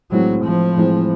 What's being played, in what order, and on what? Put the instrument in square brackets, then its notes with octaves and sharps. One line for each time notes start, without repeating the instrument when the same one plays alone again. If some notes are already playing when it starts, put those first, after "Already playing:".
[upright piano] A2 E3 G#3 C4 [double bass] F#3
[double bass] F3
[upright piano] A2 E3 G#3 C4